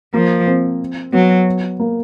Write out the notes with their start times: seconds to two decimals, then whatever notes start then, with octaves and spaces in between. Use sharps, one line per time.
0.14 F3 A#3
0.47 C4
1.13 F#3 B3
1.80 A#3